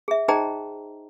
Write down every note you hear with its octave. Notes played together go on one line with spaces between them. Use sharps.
G#4 E5
D#4 G#4 C5 D#5 G5 A#5